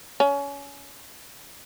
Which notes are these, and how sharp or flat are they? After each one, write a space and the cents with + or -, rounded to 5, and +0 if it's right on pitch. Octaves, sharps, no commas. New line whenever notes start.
C#4 +25